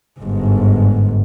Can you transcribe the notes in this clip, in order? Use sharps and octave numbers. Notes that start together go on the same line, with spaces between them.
G1 G#2